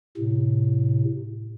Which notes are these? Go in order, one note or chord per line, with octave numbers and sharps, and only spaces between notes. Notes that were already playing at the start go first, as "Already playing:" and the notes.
A2 C3